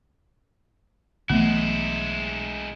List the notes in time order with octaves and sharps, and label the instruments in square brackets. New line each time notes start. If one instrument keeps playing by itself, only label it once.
[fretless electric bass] B1 E3 B3 [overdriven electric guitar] G#3 E4 [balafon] A3